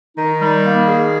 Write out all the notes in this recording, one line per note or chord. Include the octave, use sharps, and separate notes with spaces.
D#3 D#4
G3
A#3
G#4